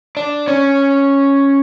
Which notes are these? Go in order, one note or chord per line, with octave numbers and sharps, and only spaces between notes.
D4
C#4